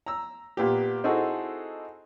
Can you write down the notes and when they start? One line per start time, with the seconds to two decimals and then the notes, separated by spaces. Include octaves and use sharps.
0.06 A#5 E6
0.57 A#2 B3 G4
1.04 C4 D#4 E4 F#4 G#4 A4